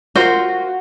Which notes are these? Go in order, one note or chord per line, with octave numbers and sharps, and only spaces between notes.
F4 F#4 A#4 C5